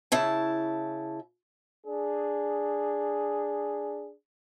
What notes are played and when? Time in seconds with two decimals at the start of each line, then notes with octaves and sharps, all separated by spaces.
0.12 C#3 E4 A5
1.86 D4 G#4